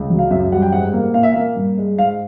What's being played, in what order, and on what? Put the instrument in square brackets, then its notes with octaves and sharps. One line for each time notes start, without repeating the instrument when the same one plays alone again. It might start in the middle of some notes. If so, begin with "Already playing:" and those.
Already playing: [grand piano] C#2
F#3
F5
F#2 E5
G3 F#5
G5
G#2 F#5
A#3
A#2 F5
E5
A#3 F5
G2
G#3
G#2 F5